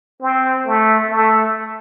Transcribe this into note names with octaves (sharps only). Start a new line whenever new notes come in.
C4
A3
A3